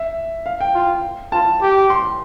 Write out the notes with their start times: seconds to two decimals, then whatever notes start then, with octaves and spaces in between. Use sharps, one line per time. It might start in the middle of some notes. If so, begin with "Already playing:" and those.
Already playing: E5
0.46 F5
0.60 G5
0.74 F4
1.32 F4 A5
1.62 G4
1.90 C6